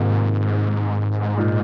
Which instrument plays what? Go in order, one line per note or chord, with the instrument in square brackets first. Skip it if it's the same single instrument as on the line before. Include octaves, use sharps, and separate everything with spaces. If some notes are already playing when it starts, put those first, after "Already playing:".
Already playing: [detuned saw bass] G#2 [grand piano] C3 D#3 A#3 F4
[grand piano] A#2 G#3 D#4